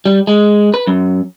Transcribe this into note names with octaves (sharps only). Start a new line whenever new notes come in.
G3
G#3
B4
F#2